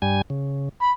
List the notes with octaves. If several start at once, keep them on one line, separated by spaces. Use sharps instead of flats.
G2 G3 G#5
C#3
B5